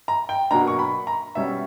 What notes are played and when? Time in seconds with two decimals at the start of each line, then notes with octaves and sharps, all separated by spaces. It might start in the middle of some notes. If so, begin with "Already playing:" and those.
0.08 A#5
0.29 G5
0.51 B2 F#3 A#3 D4 A#5
0.67 C#6
0.79 B5
1.07 A#5
1.35 B2 G3 C#4 E5